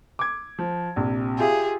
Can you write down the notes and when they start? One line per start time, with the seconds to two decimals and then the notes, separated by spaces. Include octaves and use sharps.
0.19 D6 G#6
0.58 F3
0.96 A#1 C3
1.39 F4 G4 G#4 E5